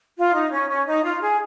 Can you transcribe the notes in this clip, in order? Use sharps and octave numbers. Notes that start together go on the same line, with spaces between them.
F4
D#4
C#4
C#4
D#4
F4
G#4